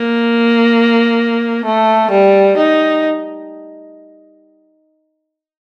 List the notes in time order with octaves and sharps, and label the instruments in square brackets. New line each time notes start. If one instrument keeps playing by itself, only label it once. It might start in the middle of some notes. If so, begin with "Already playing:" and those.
Already playing: [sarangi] A#3
A3
G3
D#4